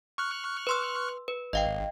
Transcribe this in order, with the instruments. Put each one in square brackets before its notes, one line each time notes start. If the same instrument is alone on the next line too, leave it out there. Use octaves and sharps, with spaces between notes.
[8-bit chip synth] C#6 F6 F#6
[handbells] B4 C6 E6
B4
[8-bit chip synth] G#1 [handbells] D#5 F5 G5